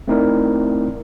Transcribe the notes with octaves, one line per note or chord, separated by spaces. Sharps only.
A3 C4 D#4 E4 A#4 D5